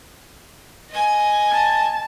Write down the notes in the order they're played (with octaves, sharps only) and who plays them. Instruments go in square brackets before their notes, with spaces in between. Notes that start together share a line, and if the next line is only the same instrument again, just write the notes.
[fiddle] D#5 G#5
[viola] A5